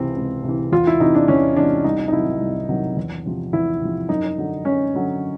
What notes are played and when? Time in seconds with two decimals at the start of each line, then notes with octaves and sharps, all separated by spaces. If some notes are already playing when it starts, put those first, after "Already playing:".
Already playing: C#2 C3 E3 C4
0.15 C#2
0.44 C3 E3
0.72 E2 F4
0.87 E4
1.00 C3 E3 D#4
1.15 D4
1.28 E2 C#4
1.56 C3 E3 D4
1.84 C2 D#4
2.08 D#4
2.13 C3 D#3 F#3 E4
2.41 C2
2.69 C3 D#3 F#3
2.97 E2
3.26 C3 F3
3.53 E2 E4
3.81 C3 F3
4.09 F#2 D#4
4.38 D3 F#3
4.65 F#2 C#4
4.94 D3 F#3